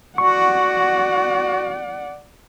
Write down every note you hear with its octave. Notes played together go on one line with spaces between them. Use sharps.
F#4 D5 F#5 C#6